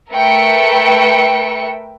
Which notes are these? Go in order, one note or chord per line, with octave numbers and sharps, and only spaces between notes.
A3 A#4 B4 E5 G5 C#7